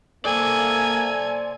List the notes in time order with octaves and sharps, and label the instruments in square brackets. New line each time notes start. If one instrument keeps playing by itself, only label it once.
[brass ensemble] A#3 [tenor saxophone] A4 [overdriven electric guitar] C5 D5 [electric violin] G#5